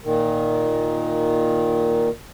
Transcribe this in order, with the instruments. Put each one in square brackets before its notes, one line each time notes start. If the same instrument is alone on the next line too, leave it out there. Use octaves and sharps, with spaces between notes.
[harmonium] A#2 D#3